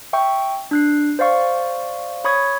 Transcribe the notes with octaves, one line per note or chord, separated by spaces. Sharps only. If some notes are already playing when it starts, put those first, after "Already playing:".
E5 G5 C#6
D4 F#6 C7
C5 D5 F5 C#6
C#5 B5 C#6 D#6 G#6